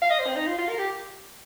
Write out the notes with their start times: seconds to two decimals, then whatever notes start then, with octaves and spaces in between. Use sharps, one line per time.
0.02 F5
0.10 D#5
0.19 C5
0.27 C4
0.36 D#4
0.47 F4
0.58 F4
0.69 A#4
0.79 G4